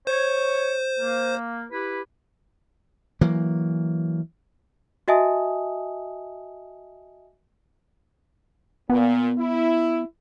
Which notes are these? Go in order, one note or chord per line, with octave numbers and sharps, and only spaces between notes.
C5 C#5
A#3
E4 G4 B4
E3 F#3 A#3
F#4 D#5 E5 G#5 A5 D#6
A#2 B3
E4